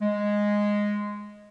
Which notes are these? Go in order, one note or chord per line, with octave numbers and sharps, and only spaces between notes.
G#3